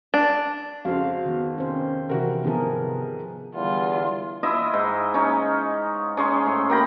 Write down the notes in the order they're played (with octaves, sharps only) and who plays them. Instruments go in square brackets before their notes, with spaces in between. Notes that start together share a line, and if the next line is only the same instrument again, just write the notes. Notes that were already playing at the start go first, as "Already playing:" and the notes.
[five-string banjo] D4
[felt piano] F2 C#3 [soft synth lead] F#4 [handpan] C5 F5
[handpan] D#3 B3
[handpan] C4 C5 [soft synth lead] C#4
[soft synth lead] C3 [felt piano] E3 F#4 A#4
[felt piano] G#2 F3 [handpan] B3 G#4 A#4
[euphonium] E2 [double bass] D3 G3 [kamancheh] F4
[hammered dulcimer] E4 F4 D#5 E5
G#2
C#4 D#4 C#5
C#4 G#4 C#5 C6
A2
A#3 G5 A#5 B5